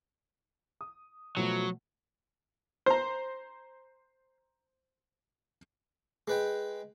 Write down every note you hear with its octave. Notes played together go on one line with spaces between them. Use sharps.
D#6
B2 F3 F#3 A3
C5 A#5
G#3 B4 G5